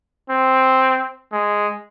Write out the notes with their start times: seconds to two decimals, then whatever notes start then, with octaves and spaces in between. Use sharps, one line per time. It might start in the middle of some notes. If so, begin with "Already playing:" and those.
0.30 C4
1.32 G#3